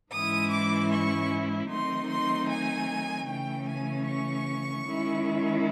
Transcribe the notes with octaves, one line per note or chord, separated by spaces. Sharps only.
G#2 E3 G#3 C#4 E4 D#6
D6
C#6
D#3 F#3 A3 C4 D#4 C6
C6
G#5
C#3 E3 A3 C#4 G5
G#5
C#6
D#3 G#3 C#4 E4